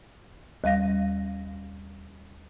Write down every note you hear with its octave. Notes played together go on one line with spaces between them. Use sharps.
D#2 G3 F5 A#6